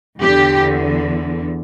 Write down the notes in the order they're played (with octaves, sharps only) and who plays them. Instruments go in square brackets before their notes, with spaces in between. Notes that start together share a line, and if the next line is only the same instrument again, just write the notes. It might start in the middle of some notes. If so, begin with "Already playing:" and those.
[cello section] E2 D3 G4